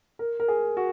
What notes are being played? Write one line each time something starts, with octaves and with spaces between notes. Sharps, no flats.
A#4
A#4
G#4
F#4